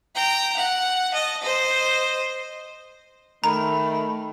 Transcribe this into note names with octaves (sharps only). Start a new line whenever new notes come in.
G5 A#5
F#5
D#5 A5
C5 D#5
D#3 A3 A#5 B5